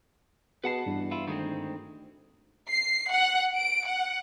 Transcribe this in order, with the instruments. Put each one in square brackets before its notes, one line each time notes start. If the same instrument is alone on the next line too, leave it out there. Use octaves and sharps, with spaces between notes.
[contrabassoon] B2 [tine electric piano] G#4 C7 [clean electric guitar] B4 F#5 A5
[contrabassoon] E2 [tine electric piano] G2
[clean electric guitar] E4 F4
[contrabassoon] D2 [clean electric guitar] D#3 G#3 C4
[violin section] C7
F#5
D7
F#5